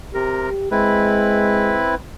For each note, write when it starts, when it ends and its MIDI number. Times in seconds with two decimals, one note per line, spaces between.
0.14 0.49 48
0.14 0.69 67
0.14 0.49 70
0.71 1.79 56
0.71 1.95 60
0.71 1.95 64
0.71 1.95 71